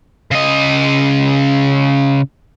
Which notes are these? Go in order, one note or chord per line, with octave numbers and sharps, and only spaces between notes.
C#3 D#5